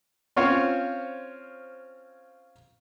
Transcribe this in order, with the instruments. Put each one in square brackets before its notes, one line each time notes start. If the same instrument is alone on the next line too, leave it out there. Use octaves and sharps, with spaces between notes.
[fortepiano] C4 C#4 F4 C5 C#5 F5